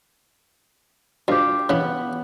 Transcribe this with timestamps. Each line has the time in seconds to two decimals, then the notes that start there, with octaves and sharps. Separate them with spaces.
1.28 D2 F4 G4
1.69 C#3 E3 B3